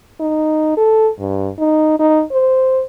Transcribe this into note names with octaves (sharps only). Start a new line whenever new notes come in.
D#4
A4
G2
D#4
D#4
C5